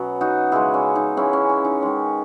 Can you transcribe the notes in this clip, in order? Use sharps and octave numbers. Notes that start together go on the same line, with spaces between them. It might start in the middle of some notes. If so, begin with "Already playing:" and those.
Already playing: B2 F#3 B3 C#4
D#4 F#4
C#3 E3 G#3 E4 G#4
C#4
D#4
C#3 E3 G#3 C#4 E4
C#4
C#4
D#4
D#3 G#3 C#4